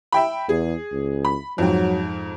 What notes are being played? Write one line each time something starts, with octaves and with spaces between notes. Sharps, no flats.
E5 G5 B5
E2 G#4
C#2
B5
F2 G#2 F#3